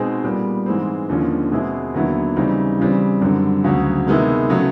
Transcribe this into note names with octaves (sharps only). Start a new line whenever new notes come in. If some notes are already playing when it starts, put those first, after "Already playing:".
Already playing: B2 G#3 C4 D#4 G#4
A#2 G3 B3
G#2 E3 G#3 C4
D#2 D3 F3 G#3 C#4
B2 G#3 C4 E4 G#4
D#2 D3 F#3 B3 E4
C#3 E3 G3 C4 D#4
C#3 E3 G3 C4
F#2 D3 G3 C4
D2 C#3 F#3
C3 D#3 G#3 B3 E4
C#3 F#3 A3